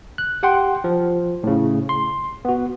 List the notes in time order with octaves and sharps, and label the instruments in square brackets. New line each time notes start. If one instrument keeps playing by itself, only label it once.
[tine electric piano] F#6
G4 F#5 G5 C6
F3
A2 C#3
C6
B3 F#4